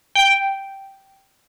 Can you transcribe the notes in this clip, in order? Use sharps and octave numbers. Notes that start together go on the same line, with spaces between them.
G5